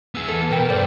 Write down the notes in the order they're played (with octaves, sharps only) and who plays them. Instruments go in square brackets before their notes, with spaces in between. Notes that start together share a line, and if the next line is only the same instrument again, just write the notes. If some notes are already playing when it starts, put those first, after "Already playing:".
[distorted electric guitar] B3 G#4 [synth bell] E6
[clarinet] E3 [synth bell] A4
[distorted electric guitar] B2 B3 [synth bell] A#4 G5
[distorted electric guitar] G2 [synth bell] C5 D5